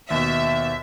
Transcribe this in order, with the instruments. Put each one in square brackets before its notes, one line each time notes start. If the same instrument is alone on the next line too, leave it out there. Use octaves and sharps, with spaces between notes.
[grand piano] D#2 B2 [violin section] E5